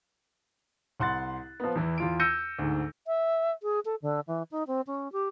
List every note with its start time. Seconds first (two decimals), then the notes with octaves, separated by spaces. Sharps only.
1.00 C2 F#5 C6 F#6 A6
1.60 F3 B3
1.75 E2 E3
1.98 E2 F4 D7
2.20 E6 G6 A#6 C#7 D#7
2.59 D2 G#2
3.07 E5
3.63 G#4
3.85 A4
4.02 D3
4.27 E3
4.51 D#4
4.67 C4
4.87 C#4
5.12 G4